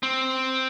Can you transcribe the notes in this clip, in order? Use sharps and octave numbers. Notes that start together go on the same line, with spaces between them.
C4